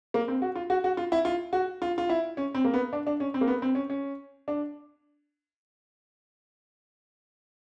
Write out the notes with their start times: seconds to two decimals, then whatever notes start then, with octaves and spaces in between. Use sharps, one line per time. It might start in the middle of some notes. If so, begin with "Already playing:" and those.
0.14 A#3
0.28 C4
0.42 F#4
0.55 F4
0.70 F#4
0.84 F#4
0.97 F4
1.12 E4
1.25 F4
1.53 F#4
1.82 F4
1.98 F4
2.09 E4
2.37 C#4
2.54 C4
2.65 A#3
2.73 B3
2.93 D4
3.07 D4
3.20 C#4
3.34 C4
3.41 A#3
3.47 B3
3.62 C4
3.75 C#4
3.90 C#4
4.48 D4